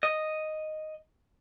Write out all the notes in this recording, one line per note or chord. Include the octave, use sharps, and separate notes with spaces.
D#5